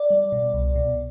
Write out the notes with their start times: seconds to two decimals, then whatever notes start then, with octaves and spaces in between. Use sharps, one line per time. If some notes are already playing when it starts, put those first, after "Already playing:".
Already playing: D5
0.10 G3
0.32 B2
0.54 C2
0.75 B2